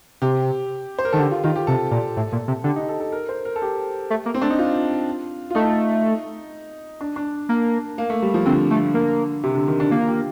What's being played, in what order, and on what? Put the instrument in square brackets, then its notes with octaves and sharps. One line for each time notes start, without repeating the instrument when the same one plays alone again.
[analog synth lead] C3 [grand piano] G4
[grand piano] C5
A#4
[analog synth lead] D#3 [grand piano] A4
[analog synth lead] D3 [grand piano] G4
[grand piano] F4
[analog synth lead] D#3 [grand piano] F4
[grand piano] G4
[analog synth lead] C3 [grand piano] A4
[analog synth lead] A#2
A2
A#2
C3
[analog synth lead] D3 [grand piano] G4
[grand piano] D#4
A4
A4
A#4
C5
A#4
A4
G4
[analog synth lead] A3
A#3
[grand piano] C4
[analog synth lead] A3 [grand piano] D4
[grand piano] D#4
F4
F4
[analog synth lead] A3 [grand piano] D#4
[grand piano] D4
D4
[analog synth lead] A#3
[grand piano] A#3
A3
G3
F3
[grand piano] D3 [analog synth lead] C4
[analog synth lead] A3
A#3
[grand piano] C3
D3
D#3
D4
[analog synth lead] A#3 [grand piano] F4
[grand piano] G4